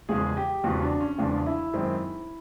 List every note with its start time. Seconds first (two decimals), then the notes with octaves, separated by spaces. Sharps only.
0.09 E2 C#3 F3 G#3 G#4
0.37 G4
0.64 E2 C#3 F3 G#3 F#4
0.82 D4
1.00 C#4
1.18 E2 C#3 F3 G#3 D4
1.46 E4
1.73 F#2 D#3 G#3 C4